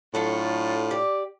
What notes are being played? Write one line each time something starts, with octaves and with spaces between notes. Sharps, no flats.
A2 F#3 D4 F4 A4
G4 D5